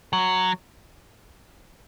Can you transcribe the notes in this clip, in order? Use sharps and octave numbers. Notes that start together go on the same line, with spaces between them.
F#3